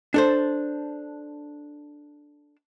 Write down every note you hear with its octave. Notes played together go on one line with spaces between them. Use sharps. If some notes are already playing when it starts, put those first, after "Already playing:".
D4 A4 C5